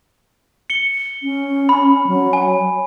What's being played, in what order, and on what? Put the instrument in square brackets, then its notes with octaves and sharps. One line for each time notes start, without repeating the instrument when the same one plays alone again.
[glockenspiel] C#7 G7
[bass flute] C#4
[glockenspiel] B5
[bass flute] F#3
[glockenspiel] G#5